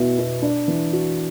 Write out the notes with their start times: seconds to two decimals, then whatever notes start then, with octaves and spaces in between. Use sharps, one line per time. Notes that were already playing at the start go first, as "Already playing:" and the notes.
Already playing: B2 B3 E4
0.19 B2
0.42 D4
0.68 E3
0.93 F#4